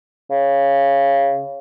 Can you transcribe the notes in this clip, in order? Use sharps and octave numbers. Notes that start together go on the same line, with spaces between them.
C#3